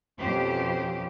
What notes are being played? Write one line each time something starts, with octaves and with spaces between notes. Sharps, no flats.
F2 B2 F3 C#4 G4 C5